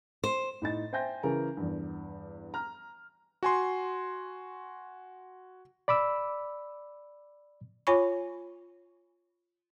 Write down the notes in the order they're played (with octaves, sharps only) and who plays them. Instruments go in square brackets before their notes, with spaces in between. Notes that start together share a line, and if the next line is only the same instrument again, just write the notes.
[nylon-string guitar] C5
[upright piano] A2 D#4 A6
C5 E5 G5 G#5 G6 A#6
C#3 E3 C#4 G#4 A#4
E2 G2
A#5 F6
[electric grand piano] F#4 G#5 C6
[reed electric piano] D5 B5 D6 E6
[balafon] F4 C#5 G#5 B5 C#6